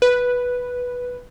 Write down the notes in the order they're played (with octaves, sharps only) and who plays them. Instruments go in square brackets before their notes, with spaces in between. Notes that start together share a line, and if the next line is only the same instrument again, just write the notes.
[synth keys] B4